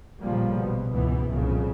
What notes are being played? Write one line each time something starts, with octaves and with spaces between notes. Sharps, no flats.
A1 A#2 C#3 F3 G3 A#3
A#1 B2 B3
C#2 G#2 B2 E3 B3
C2 F2 A#2 C#3